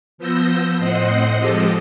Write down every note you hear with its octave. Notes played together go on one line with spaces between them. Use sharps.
F3 B3 E6 G6 A#6
A2 C4 C5 D#5 F#5 C7
F3 G#3 C4 G4 A4 D#5